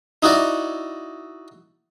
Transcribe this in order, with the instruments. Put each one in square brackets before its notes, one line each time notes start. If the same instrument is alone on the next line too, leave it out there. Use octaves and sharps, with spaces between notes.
[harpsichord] D#4 E4 F#4 D5